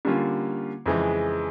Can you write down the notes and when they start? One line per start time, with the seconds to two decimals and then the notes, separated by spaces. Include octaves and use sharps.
0.05 D3 G3 A#3 C#4 F4
0.86 F2 C#3 E3 G#3